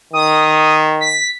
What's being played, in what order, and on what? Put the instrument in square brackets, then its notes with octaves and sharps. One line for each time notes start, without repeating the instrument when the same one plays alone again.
[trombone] D#3 [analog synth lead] D#6
[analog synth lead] B6